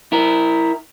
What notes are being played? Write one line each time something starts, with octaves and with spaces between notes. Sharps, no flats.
E4 A#4